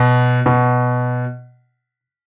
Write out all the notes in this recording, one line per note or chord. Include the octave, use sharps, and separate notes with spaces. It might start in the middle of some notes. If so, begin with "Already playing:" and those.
Already playing: B2
B2